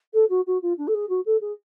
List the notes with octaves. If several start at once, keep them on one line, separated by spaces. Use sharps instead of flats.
A4
F#4
F#4
F4
D4
A4
G#4
F#4
A4
G#4